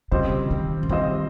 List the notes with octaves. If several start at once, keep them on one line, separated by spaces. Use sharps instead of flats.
C#3 G3 C4 F4 C5 D#5
D#3
C#3
D#3 G3 C4 F4 C5 D#5